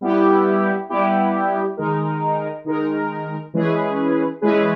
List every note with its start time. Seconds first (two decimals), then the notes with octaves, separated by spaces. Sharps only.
0.01 G3 B3 E4 G4
0.89 G3 B3 E4 G4
1.77 D#3 G#3 D#4 A#4
2.65 D#3 G#3 D#4 A#4
3.54 E3 G#3 C#4 G#4 B4
4.41 E3 G#3 C#4 G#4 B4